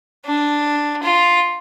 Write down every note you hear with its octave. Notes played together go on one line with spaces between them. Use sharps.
D4
F4